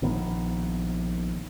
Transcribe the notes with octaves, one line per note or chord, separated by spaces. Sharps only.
A#1 D#3 B3